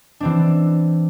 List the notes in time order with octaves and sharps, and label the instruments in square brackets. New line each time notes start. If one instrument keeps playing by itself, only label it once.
[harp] E3 C4 D4